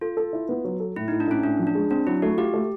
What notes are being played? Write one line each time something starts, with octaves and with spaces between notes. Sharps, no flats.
F4 A4
A4
E4
B3
F#3
A4
A2 E4
D#4
A2
D4
A2 C#4
A2 D4
F3
D4
G#3
C4 D4
F#3 E4
A3 F#4
F4 G4
A3